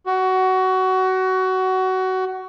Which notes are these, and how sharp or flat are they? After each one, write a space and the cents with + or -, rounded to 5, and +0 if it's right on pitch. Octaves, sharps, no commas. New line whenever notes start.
F#4 +20